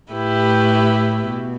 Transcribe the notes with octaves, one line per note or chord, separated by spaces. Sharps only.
A2 A3 E4 G4 B4
B2